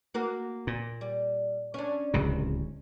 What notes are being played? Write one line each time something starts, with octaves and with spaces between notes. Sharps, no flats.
A#3 F#4 A#4
A#2
G3
C#4 D4
D1 C#2 C3